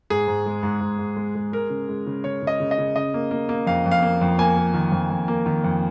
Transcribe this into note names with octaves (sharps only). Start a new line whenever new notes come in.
G#2 G#4
G#2
G#3
G#2
G#2
G#2
G#3
G#3
G#3 A#4
C#3
G#3
C#3
C#3 C#5
C#3
D#5
C#3
D#5
C#3
C#3 D#5
A#3
A#3
A#3
F2 F5
F2
F5
A#3
F2
A#3 G#5
A#3
D#3
F2
F2
A#3
D#3
F2